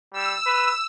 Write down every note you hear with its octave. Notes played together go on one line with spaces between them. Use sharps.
G3 E6
B4